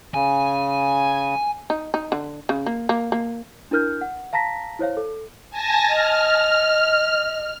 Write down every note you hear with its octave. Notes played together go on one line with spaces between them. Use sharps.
C#3 G#5
D#4
D#4
D3
C#3
A#3
A#3
A#3
D4 E4 A#4 F6 G6
F#5
F5 A5 A#5 A#6 B6
E4 C5 C#5 F5
A4
G#5 A5 A#6
D#5 F6